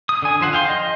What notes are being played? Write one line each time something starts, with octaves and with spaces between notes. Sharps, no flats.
D#6
D3 G#5
D3 F3 C5 F#5
F5 G5 C6
D#5